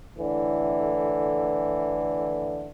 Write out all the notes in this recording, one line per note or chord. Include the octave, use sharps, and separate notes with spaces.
A2 D3 E3